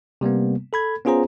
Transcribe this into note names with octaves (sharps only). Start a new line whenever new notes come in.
C3 G3 A#3 B3
A4 B5 G#6
B3 C#4 F4 G#4 C5 A#5